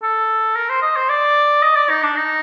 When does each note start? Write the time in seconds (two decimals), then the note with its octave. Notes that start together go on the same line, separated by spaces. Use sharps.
0.02 A4
0.56 A#4
0.69 C5
0.82 D#5
0.96 C5
1.09 D5
1.63 D#5
1.76 D5
1.90 D#4
2.03 D4
2.17 D#4